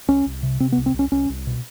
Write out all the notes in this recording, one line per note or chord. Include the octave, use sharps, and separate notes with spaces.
C2 C#4
C2
C3
C3 C4
B3
C2
C4
C2
C#4
C2 C#4
C2
B2